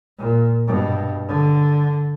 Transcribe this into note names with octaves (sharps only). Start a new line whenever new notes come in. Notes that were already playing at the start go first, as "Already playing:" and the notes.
A#2
G2 B2
D3